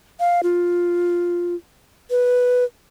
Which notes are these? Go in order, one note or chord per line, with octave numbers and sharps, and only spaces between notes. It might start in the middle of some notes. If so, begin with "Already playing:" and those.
F5
F4
B4